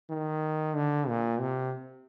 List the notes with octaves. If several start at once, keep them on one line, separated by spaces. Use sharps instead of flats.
D#3
D3
A#2
C3